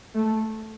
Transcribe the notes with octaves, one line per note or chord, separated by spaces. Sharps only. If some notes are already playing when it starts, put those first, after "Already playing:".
A3